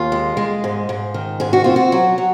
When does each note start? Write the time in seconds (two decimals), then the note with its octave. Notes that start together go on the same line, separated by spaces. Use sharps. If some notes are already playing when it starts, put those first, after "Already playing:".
Already playing: D#2 F4
0.12 G#3
0.37 G#3
0.64 G#2
0.89 G#2
1.14 D#3
1.40 G#2 G#4
1.53 F#4
1.64 C4 F4
1.76 F#4
1.92 F#3
2.18 F#3